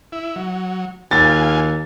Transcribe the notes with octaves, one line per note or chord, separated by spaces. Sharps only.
E4
F#3
D#2 F4 G#5 A6